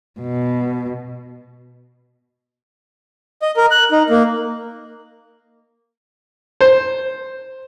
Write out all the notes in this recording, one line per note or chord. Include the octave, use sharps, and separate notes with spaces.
B2
D#5
A#4
F#6
D#4
A#3
C5